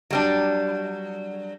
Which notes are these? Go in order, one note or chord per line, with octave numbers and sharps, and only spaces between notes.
F#3 G3 D4